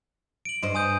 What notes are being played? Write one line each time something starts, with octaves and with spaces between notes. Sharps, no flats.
D7 F#7
G2 C5 D#5
G#5 D#6 G6